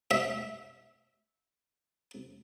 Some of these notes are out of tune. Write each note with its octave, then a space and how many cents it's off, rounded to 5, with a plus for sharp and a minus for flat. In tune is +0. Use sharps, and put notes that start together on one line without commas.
E5 -20